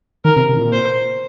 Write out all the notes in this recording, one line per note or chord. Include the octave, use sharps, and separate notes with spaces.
D#3 A#4
C3
C3
A2
A#2
C5